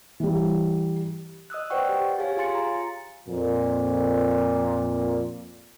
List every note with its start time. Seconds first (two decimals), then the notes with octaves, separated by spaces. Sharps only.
0.20 E3 G3
1.50 D#5 D#6 E6 F#6
1.70 B4 C5 D5 F#5 G5 C#6
1.89 G4
2.18 G4 G#4 C#5 F5 G#5
2.37 F4 F5 G#5 C6 A6 C#7
2.55 A#5
3.28 F2 A#2